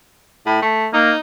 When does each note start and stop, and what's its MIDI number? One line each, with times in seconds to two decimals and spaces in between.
0.46 0.58 45
0.62 0.87 57
0.93 1.12 58
0.93 1.18 63